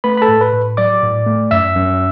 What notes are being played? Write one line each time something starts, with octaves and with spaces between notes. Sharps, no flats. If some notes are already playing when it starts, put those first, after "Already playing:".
A3 B4 B5
B5
A4 A5
A2
B4 B5
A2
F#3 D5 D6
A2
A3
F#2 E5 E6
F#2